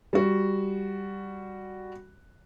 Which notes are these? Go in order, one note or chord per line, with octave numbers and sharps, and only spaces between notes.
G3 F#4